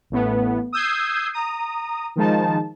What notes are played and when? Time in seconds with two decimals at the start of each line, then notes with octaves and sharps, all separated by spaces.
0.10 A1 A2 B3
0.73 D#6 E6 G6 G#6 C7
1.33 A#5 D#6
2.16 D#3 F3 G#3 D#4 A5